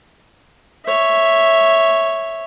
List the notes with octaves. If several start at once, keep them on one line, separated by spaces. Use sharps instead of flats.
C#5 E5